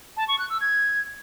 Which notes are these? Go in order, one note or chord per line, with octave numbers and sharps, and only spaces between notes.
A5
C#6
F#6
E6
G#6